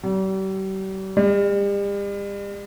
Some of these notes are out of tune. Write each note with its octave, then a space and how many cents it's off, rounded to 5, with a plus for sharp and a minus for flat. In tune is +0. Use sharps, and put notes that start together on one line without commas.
G3 -40
G3 +40